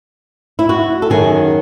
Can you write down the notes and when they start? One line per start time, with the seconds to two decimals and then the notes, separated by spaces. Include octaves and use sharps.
0.59 E4
0.69 F#4
1.02 A4
1.10 F#2 D#3 F#3 G#4